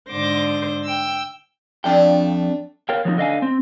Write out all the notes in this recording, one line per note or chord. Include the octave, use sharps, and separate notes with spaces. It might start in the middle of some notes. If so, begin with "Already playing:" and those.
G#2 D3 C5 D6 A#6
G5 E6
F2 A3 D4 G5
A#4 C#5 F5 G5
F3 F#3 A#3 D#4
D3 D#5 F5 G#5
C4